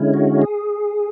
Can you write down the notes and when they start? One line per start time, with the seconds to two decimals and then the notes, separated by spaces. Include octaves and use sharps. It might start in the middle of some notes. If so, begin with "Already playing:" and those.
Already playing: D3 G#3 C#4 E4
0.14 F#4
0.42 G#4